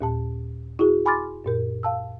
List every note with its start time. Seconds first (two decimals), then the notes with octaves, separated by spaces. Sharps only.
0.01 D#2 A#2 A5
0.79 E4 F#4 G#4
1.06 G#5 B5 C6 D6 F6 A6
1.44 F#2 A#2 A#4
1.83 F5 A5 E6